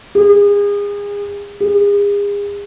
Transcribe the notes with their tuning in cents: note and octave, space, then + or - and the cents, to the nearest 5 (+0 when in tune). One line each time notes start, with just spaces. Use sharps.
G#4 -35
G#4 -40